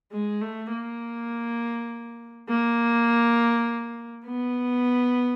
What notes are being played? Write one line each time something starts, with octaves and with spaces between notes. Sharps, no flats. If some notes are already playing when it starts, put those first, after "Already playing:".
G#3
A3
A#3
A#3
B3